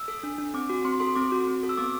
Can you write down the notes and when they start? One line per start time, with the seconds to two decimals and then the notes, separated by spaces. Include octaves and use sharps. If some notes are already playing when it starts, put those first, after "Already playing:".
Already playing: E6
0.08 A4
0.23 D4
0.38 D4
0.54 C4 D6
0.69 F#4
0.85 C4 C6
1.00 A4 C6
1.16 C4 D6
1.32 F#4
1.47 C4
1.63 A4
1.69 E6
1.77 B3 D6